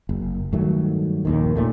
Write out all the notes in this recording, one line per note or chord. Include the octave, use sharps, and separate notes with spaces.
F#1
G2 D#3 F#3 A3
A#1 D#2 D#3
E1 A#2 A3